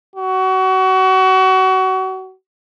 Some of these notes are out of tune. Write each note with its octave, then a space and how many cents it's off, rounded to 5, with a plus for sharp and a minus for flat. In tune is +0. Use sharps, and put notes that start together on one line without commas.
F#4 +25